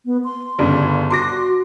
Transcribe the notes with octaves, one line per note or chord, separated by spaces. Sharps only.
B3
C6
G1 C#3 D4
F#4 C6 D6 A#6